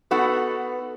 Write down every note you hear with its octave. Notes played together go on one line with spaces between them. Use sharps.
B3 D#4 F#4 A4 B4